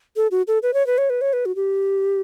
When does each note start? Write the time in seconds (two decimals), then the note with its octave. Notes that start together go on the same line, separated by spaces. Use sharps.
0.16 A4
0.31 F#4
0.48 A4
0.63 B4
0.74 C#5
0.87 B4
0.98 C#5
1.10 B4
1.21 C#5
1.33 B4
1.46 F#4
1.56 G4